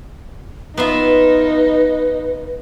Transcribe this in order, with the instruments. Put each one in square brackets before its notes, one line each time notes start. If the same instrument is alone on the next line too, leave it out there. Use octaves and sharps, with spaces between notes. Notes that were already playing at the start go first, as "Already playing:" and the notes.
[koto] B3 F4 E5 [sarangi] D#4 [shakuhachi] B4